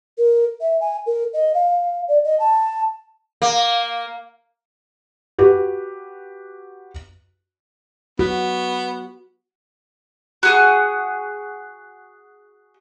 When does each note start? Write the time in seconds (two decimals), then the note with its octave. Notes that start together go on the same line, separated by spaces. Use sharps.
0.18 A#4
0.61 E5
0.81 G#5
1.06 A#4
1.34 D#5
1.54 F5
2.08 D5
2.24 D#5
2.40 A5
3.42 A#3
5.38 F#4 G4 B4
8.19 B3 F#4
10.43 F#4 G#4 C#6